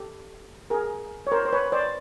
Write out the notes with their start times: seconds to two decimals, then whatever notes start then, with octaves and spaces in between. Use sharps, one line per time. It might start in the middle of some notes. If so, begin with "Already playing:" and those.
Already playing: G4 A4
0.70 G#4 A#4
1.27 C#5
1.32 A#4 C5
1.45 C5
1.53 B4 C#5
1.72 C5 D5